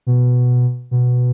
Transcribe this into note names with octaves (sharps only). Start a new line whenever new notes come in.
B2
B2